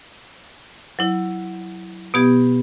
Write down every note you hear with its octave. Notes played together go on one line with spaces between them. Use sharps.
F#3 E4
B2 B3 G4 G#6